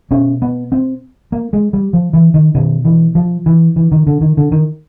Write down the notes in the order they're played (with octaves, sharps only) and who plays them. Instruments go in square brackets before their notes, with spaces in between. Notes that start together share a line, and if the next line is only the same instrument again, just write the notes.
[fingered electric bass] B2 C#4
B3
C4
A#3
G#3
G3
F3
E3
D#3
B2 D#3
E3
F3
E3
E3
D#3
D3
D#3
D3
D#3